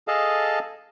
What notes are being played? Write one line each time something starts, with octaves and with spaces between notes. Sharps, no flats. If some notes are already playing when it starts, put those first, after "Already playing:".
G#4 A4 D#5 F5 A5